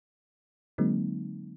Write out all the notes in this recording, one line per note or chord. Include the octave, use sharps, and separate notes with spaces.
D3 F#3 G#3 A#3 C4 D#4